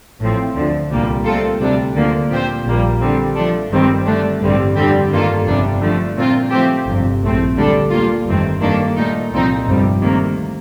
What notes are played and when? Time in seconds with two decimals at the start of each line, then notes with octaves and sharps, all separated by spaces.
0.20 A1 A2 F3 C4
0.55 D2 D3 F3
0.90 C2 A#2 G3 A#3
1.25 A#2 A3 C4 F4 A4
1.59 D2 C3 G3 D4
1.95 D2 D3 F3 A#3
2.30 A#2 F3 C4 G4 C5
2.65 A#1 A#2 G3 A#3
3.01 D3 G3 C4
3.35 F3 A3 D4 A4
3.70 G1 G2 D#3 G3 C4
4.06 D3 A3 D4
4.41 A1 G2 D3 G3 C4
4.75 F2 D3 G3 C4 G4
5.10 G2 D#3 A#3 F4 A4
5.46 G1 F2 C3 G3 D4
5.81 D3 F3 A3
6.16 A#2 A3 C4 F4
6.51 F3 A3 C4 G4 C5
6.86 G1 F2 C3
7.21 A#1 A2 A3 C4
7.56 D2 D3 G3 D4 A4
7.90 A#2 G3 A#3 F4
8.25 G1 F2 D#3 A3 C4
8.60 G2 D#3 A#3 D4 A4
8.96 A#2 A3 D#4
9.31 C2 A#2 F3 C4 D#4
9.66 G1 F2 C3 G3
10.01 D2 C3 D#3 A#3